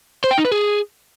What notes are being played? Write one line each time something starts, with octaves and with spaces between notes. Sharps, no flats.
C5
G5
D#4
B4
G#4